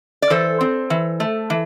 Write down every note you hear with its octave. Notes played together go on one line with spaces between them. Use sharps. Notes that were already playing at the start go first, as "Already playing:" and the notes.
D5
E3 A4 C5
C4
E3
A3
E3